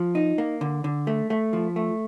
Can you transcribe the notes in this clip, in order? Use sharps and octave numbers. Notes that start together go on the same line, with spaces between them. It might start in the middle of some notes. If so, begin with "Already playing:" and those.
Already playing: F3
D#4
A#3
D3
D3
A3
A3
F3
A3